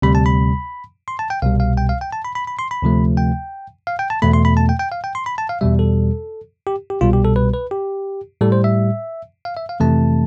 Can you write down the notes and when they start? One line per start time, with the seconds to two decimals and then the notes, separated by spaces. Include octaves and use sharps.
0.02 D2 C3 G3 B5
0.15 A5
0.26 B5
1.08 C6
1.19 A5
1.30 G5
1.42 C2 B2 G3 F5
1.60 F5
1.77 G5
1.89 F5
2.01 G5
2.13 A5
2.25 B5
2.35 B5
2.47 B5
2.59 C6
2.71 B5
2.82 D2 C3 F3 A3
3.17 G5
3.87 F5
3.99 G5
4.10 A5
4.22 E2 B2 A3 B5
4.33 C6
4.45 B5
4.57 A5
4.69 G5
4.79 G5
4.92 F5
5.04 G5
5.15 C6
5.26 B5
5.38 A5
5.49 F5
5.61 E2 B2 G3 E5
5.79 A4
6.67 G4
6.90 G4
7.01 C2 B2 G3 F4
7.13 G4
7.24 A4
7.36 B4
7.53 B4
7.71 G4
8.41 A2 G3 A4
8.52 C5
8.64 E5
9.45 F5
9.57 E5
9.69 F5
9.80 F2 C3 E3 A3 A5